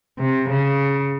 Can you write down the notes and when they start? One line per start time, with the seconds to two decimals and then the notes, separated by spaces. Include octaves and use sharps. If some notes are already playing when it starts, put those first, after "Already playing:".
0.19 C3
0.50 C#3